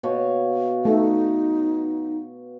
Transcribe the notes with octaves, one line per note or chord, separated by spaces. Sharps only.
B2 C#5 F5
A3 D#4